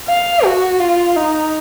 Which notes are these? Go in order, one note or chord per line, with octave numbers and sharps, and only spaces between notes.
F5
F#4
F4
D#4